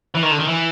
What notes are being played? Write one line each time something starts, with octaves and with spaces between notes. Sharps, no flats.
E3
D#3
D3
D#3
E3